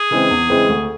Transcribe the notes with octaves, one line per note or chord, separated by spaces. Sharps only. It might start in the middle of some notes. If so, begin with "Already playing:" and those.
Already playing: G#4
C#3 E3 G#3 C4
E2
C#3 E3 G#3 C4
D2